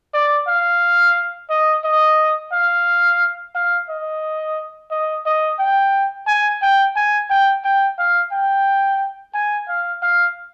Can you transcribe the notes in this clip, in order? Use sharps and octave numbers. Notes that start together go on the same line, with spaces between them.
D5
F5
D#5
D#5
F5
F5
D#5
D#5
D#5
G5
G#5
G5
G#5
G5
G5
F5
G5
G#5
F5
F5